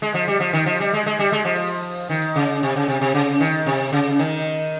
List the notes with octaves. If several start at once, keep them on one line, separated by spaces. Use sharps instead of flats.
G#3
F3
G3
F3
D#3
F3
G3
G#3
G#3
G3
G#3
F3
D#3
C#3
C3
C#3
C3
C3
C#3
D#3
C3
C#3
D#3